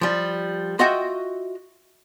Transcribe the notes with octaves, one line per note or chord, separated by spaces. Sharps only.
F3 G3
F4 F#4 D#5 E5 F#5 G5